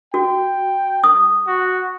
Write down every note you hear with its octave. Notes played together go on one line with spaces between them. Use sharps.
F#4 G5
D#6
F#4